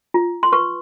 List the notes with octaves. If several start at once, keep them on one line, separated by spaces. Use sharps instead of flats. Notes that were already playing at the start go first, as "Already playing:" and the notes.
F4
C6
B4 C#6